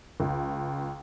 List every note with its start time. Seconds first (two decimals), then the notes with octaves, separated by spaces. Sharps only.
0.20 C#2